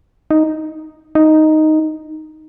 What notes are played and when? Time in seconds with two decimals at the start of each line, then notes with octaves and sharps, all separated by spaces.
0.31 D#4
1.15 D#4